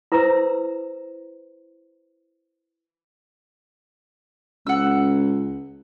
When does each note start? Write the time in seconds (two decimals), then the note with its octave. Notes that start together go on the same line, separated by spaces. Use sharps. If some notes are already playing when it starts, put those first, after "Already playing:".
0.12 E4 B4 C5 A#5 E6
4.67 C#2 F#5 E6